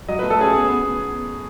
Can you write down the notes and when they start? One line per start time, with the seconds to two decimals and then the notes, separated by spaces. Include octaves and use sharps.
0.08 F#3 D#5
0.19 A3 B4
0.30 A4
0.38 C#4 G#4
0.53 B3 G#4
0.68 B3
0.83 B3